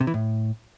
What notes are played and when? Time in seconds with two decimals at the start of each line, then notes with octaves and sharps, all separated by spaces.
0.01 C3
0.07 E3
0.14 A2